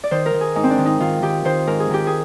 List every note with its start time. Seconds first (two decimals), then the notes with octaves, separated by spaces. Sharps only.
0.04 D5
0.11 D#3 C5
0.26 A#4
0.33 D#3
0.41 G#4
0.55 G#2 D#4
0.63 C4
0.70 D4
0.78 D#3
0.86 D#4
1.00 D#3 F4
1.22 D#3 G4
1.45 D#3 C5
1.67 G#2 A#4
1.80 G#4
1.90 D#3 G4
2.07 G#4